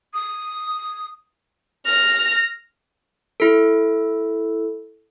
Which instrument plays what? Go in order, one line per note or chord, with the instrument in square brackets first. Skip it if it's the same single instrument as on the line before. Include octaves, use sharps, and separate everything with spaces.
[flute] D#6
[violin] F6 A#6
[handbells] E4 A4